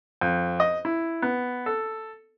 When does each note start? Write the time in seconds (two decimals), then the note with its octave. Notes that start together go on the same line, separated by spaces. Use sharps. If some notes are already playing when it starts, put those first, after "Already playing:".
0.21 F2
0.60 D#5
0.85 E4
1.22 B3
1.66 A4